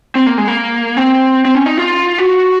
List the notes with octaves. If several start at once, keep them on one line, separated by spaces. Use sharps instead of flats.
C4
A#3
G#3
A#3
C4
C4
C#4
D#4
F4
F#4